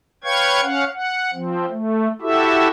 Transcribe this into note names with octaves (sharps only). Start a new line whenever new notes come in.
B4 C#5 F5 G5 C#6 G#6
C#4 F5 F#5
F#5
F3 C4
A3
E4 F#4 G4 A4 E5